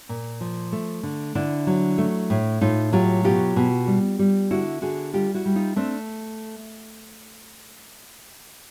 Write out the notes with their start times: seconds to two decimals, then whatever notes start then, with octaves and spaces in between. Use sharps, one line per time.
0.09 A#2
0.41 F3
0.72 A3
1.03 D3
1.35 D3 D4 E4
1.67 F#3
1.98 A3
2.30 A2
2.61 A2 D#4 F4
2.93 F#3 F4 G4
3.24 B2 F4 G4
3.56 B2
3.87 G3
4.19 G3
4.50 D3 E4 F#4
4.82 D3 F#4 G#4
5.14 G3 F4 G4
5.34 E4 F#4
5.45 G3
5.56 D#4 F4
5.76 A3 C4 D4